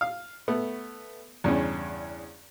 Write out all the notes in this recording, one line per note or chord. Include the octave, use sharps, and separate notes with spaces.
F5
A3 B3
E2 G2 C#3 C#4